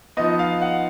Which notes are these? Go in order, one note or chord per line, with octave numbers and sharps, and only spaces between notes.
F3 B3 D#4 D#5
F5
F#5